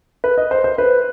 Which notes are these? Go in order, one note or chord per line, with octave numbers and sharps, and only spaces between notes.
B4
D#5
C5
C5
B4